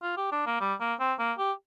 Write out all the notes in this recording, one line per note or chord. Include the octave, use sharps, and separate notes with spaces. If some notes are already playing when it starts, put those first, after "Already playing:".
F4
G4
D4
A#3
G3
A#3
C4
A#3
G4